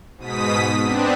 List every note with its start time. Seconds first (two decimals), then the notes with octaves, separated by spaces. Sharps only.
0.17 G#2 B2 D#6 B6
0.83 B3 C4 D4